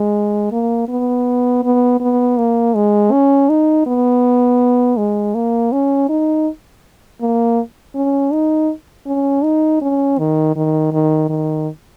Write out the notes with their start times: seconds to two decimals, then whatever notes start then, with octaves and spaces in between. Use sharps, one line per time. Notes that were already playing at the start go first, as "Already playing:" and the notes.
Already playing: G#3
0.52 A#3
0.88 B3
1.63 B3
2.00 B3
2.38 A#3
2.75 G#3
3.12 C#4
3.49 D#4
3.86 B3
4.97 G#3
5.35 A#3
5.72 C#4
6.09 D#4
7.21 A#3
7.95 C#4
8.33 D#4
9.06 C#4
9.44 D#4
9.81 C#4
10.18 D#3
10.56 D#3
10.92 D#3
11.29 D#3